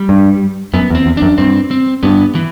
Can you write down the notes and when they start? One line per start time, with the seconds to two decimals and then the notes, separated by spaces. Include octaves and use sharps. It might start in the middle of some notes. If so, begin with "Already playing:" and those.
Already playing: G3
0.09 G2
0.73 F#2 B3
0.90 E2
0.95 C4
1.06 E2
1.17 F#2 D4
1.38 G2 C4
1.71 C4
2.03 G2 B3
2.35 E3